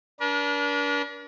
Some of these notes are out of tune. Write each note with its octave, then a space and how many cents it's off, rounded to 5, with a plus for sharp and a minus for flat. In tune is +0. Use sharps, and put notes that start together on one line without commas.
D4 -30 A#4 +45